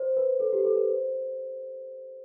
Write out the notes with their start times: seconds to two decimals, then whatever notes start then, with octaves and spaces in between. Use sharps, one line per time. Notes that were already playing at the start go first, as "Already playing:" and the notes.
Already playing: C5
0.17 B4
0.40 A4
0.53 G4
0.65 A4
0.76 B4
0.89 C5